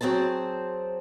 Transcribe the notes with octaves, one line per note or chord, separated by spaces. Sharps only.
F#3 C4 G#4 C5 A5